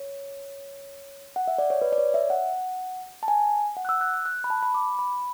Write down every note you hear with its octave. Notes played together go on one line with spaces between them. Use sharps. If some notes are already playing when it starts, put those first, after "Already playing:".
Already playing: C#5
F#5
E5
D5
C#5
B4
D5
C#5
E5
F#5
A5
G#5
F#5
F#6
E6
F#6
F#6
F#6
B5
A5
B5
D6
B5